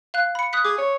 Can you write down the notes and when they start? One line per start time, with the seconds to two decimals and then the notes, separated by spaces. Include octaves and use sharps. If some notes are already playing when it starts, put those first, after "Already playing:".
0.14 F5 F#6
0.35 B5 C#7
0.53 D#6 F#6 B6
0.65 G#4 D6
0.78 C#5